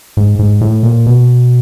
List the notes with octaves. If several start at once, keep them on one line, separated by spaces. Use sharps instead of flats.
G#2
G#2
A2
A#2
B2